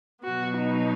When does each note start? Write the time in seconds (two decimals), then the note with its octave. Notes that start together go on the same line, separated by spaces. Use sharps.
0.23 B2 F#3 B3 F#4
0.57 D#4